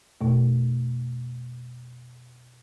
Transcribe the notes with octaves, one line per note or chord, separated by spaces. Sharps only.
F2 B2 A3